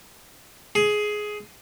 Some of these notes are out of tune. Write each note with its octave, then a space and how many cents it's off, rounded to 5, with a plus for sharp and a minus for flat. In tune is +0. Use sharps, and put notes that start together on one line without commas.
G#4 +10